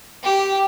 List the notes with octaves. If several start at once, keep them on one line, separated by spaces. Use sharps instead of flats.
G4